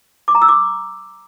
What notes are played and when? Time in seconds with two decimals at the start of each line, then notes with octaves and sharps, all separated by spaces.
0.28 D6
0.35 A#5
0.42 E6
0.48 D6